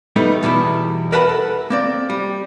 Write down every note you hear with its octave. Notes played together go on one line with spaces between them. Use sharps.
G3 A3 B3 D#4
E2 B2 G3 E4
A#4 B4 E5 F#5 A5 B5
A4
A#3 C4 D5
G3